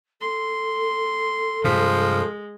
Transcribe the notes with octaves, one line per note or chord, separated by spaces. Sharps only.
A4 C6
G2 C3 F3 G#3